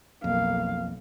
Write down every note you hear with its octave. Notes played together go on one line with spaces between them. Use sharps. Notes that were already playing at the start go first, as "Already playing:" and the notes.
B1 F2 A#3 F5